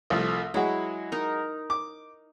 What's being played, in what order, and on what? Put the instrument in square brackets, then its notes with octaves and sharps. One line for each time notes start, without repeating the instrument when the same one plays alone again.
[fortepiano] C2 F3 A3
[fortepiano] F#3 G#3 F#4 [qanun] E4
[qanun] D#4 A#4
[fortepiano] D6